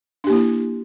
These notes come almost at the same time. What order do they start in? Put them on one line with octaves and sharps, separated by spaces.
D4 G4 A#3 E4